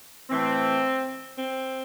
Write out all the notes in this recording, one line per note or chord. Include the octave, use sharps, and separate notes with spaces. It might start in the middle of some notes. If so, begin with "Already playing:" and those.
A2 E3 A3 C4
C4